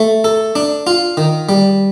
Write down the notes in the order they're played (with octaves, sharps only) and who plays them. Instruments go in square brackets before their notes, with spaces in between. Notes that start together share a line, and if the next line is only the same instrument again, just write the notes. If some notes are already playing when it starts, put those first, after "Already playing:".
Already playing: [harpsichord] A3
A4
D4
F4
D#3
G3